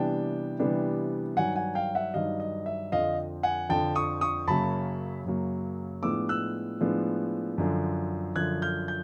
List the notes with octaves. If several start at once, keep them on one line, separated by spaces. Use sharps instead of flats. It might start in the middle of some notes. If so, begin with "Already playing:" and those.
Already playing: C3 E3 G3 B3 D4 G5 A5
C3 E3 G3 B3 D4
G2 D#3 F#3 F#5 G#5
F#5 G#5
F5 G5
E5 F#5
G2 D#3 F#3 D#5 F5
D#5
E5
F2 D3 F3 D#5 F5
F#5 G#5
F2 D3 F3 G5 A5
C#6 D#6
C#6 D#6
F#2 C#3 F#3 A#3 A5 B5
F#2 C#3 F#3 A#3
A2 F3 G#3 B3 D4 D6 E6
E6 F#6
A2 F3 G#3 B3 D4
F#2 D3 F3
F#2 D3 F3 F#6 G#6
F6 G6
G6